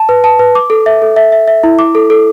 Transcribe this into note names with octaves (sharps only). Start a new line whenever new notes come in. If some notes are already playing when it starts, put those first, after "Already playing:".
Already playing: A5
B4
A5
B4
D6
A4
E5
A4
E5
E5
E5
E4
D6
A4
A4